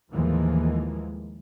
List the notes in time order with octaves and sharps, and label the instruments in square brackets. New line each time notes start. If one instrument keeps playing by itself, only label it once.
[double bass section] D#2 A2 E3 F3 G#3 A#3